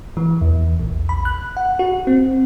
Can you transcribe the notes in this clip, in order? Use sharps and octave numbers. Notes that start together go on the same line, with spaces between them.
E3
E2
A#1
B5
F#6
F#5
F#4
C4